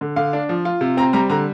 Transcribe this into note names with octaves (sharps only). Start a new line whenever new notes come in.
D3
D3 F5
D4
F3
F4
C3
C4 A#5
G3 A#5
D3 A#5